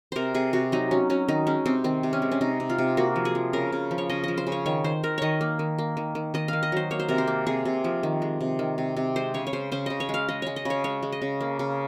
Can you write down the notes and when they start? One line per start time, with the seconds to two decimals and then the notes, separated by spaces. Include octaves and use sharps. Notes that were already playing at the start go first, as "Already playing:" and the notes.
0.12 C3 A#4 C5
0.34 C3 G#4
0.53 C3 F#4
0.72 F#3 D#4
0.91 F#3 C#4
1.10 F#3 C#4
1.28 D#3 D#4
1.47 G#3 C#4
1.66 C3 C4
1.84 D#3 C4
2.03 C3
2.13 C#4
2.22 G#3
2.32 C#4
2.41 C3 D#4
2.60 C3
2.70 F4
2.78 C3
2.97 A#3 F#4
3.16 F3
3.25 G#4
3.35 F3
3.53 C#3 A#4
3.72 C#3
3.91 F3
3.98 C#5
4.09 C#3 D#5
4.24 F3 D#5
4.38 C5
4.47 C#3
4.52 C#5
4.66 D#3 C#5
4.84 D#3 C5
5.03 D#3 A#4
5.18 D#3 C#5 D#5
5.41 A#3
5.59 D#3
5.78 A#3
5.97 D#3
6.15 D#3
6.34 D#3 D#5
6.48 D#3 F5
6.63 D#5
6.72 F#3 C5
6.91 A#3 C#5
6.99 C5
7.09 C3 A#4
7.18 C5
7.28 A#3
7.47 C3 G#4
7.65 C3
7.84 F3
8.03 D#3
8.22 G#3
8.41 C3
8.59 D#3
8.78 C3
8.97 C3
9.16 G#3 C5
9.34 C#3 C#5
9.47 C#5
9.53 C#3 C5
9.72 C#3 C5
9.86 C#3 D#5
10.00 C#5
10.09 G#3 F5
10.28 G#3 D#5
10.42 G#3 C#5
10.56 D#5
10.65 C#3 C#5
10.84 G#3 C#5
11.03 G#3
11.12 D#5
11.22 C#3
11.41 A#3
11.59 C#3